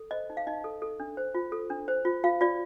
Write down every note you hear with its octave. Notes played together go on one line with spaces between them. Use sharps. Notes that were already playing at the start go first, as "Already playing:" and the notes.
Already playing: A4
C5 D#5
D#4
F5
D#4 D#5
A4
A4
D4
C5
F4
A4
D4
C5
F4
F4 F5
F4 D5